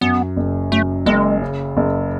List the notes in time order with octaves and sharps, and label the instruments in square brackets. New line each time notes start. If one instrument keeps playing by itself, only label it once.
[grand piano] F#2 [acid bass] B3
[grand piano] F#1
[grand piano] F#2 [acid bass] A3
[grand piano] F#1 [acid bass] G#3
[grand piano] C#3
F#1